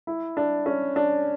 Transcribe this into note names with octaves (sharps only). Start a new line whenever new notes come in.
E4
D4
C#4
D4